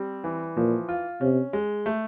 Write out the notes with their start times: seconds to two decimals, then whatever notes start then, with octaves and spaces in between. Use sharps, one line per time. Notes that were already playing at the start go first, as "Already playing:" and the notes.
Already playing: G3 C4
0.24 E3
0.57 A#2 F3
0.89 F4
1.21 C3 C#4
1.53 G#3
1.86 A3